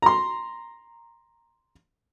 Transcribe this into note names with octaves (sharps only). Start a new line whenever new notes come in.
A#5 C6